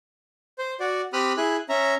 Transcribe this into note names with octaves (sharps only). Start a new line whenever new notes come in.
C5
F#4 D5
C4 G4 B5 D#6 F6 F#6
E4 G#4 F#6
C#4 E5 A#5